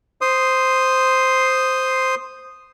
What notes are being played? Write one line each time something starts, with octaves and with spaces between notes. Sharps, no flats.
C5 C6 D#6